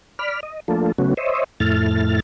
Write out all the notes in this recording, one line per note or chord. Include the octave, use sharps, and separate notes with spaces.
D5 B5 F6
D#5
F3 A3 A#3 D4 F4 A4
C#3 F#3 A3 B3 C#4 F#4
C5 C#5 D#5 E5
F2 A2 A3 E4 F6 A6